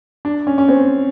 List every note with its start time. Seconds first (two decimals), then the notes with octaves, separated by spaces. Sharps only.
0.25 D4
0.47 C#4
0.58 C#4
0.68 C4